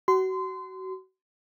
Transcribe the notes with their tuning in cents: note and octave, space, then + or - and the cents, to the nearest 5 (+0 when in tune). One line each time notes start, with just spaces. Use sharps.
F#4 +30 C6 -25